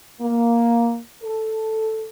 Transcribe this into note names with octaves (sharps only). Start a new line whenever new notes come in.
A#3
A4